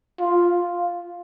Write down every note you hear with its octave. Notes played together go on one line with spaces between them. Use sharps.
F4